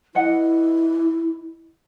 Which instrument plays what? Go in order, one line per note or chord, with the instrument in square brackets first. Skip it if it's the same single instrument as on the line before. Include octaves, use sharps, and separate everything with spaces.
[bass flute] E4 [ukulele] B4 D#5 F#5